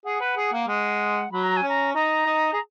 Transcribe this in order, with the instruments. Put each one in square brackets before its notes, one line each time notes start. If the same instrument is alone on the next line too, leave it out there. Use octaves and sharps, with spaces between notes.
[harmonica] G#4 [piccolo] F#5
[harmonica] B4
G#4
A#3
[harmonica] G#3 [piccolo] F#5
[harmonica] F#3 [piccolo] B5
[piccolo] A#5
G#5
[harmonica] C#4
[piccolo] A#5
[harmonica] D#4 [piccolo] A#5
[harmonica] D#4
G#4